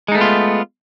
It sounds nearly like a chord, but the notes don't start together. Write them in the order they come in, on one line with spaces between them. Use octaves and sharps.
G#3 D#4 A3 B3 F4